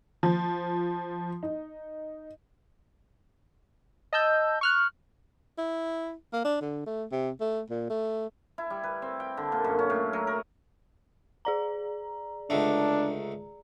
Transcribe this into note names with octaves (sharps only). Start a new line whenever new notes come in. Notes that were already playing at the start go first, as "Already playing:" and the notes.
F3
D#4
D#5 A5 E6 G6
C#6 F6 F#6
E4
A#3
D4
D3
A3
C3
A3
A#2
A3
E4
G3
B4
C4
G5
D3
A#2
F#2
C#4
A2
F#3
A#4
G#4 D5 A#5
C#2 D3 A3 D4